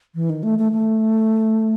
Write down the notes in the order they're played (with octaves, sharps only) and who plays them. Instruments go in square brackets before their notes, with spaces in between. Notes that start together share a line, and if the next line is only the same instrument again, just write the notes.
[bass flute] E3
D#3
A3
A3
A3